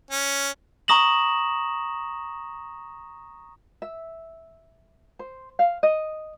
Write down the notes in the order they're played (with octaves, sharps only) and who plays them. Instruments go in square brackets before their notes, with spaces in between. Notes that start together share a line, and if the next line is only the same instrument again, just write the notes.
[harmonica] C#4
[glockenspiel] A#5 C#6 D#6 A#6 E7 F#7
[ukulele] E5
C5
F5
D#5